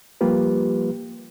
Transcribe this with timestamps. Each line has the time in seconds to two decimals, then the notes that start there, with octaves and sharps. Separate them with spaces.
0.21 F3 G3 A#3 F4 G4 B4